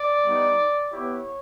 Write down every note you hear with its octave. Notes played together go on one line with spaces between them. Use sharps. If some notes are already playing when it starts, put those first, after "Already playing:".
Already playing: D5
G3 B3 D#4
B3 E4 G4 C#5